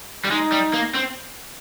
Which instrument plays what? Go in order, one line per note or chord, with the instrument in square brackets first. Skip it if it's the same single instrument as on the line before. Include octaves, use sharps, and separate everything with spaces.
[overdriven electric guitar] G3
[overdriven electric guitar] G#3 [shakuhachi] D#4
[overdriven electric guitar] G3
A#3
C4